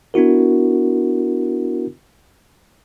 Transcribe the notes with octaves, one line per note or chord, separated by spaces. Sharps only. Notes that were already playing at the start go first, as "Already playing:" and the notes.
B3 D4 E4 F#4 A#4